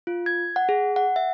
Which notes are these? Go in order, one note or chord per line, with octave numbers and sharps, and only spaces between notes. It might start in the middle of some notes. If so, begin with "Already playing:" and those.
F4
G#6
F#5
G#4
F#5
E5